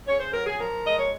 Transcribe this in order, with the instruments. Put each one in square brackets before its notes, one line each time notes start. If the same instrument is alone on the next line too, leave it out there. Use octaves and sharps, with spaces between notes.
[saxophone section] C#3 C#5
C5
F#3 A#4
G#4
F3 A#4
G#3 D#5
C#5